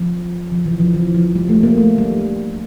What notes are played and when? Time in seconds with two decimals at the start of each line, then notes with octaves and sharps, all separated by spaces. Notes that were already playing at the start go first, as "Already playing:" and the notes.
Already playing: F3
0.52 F3
0.66 E3
0.80 F3
0.94 E3
1.14 F3
1.36 G3
1.49 A3
1.63 A#3
1.78 A3
1.98 G3